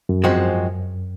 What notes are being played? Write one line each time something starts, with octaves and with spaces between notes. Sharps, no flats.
F#2
G#2 F3 G#3 C4 F#4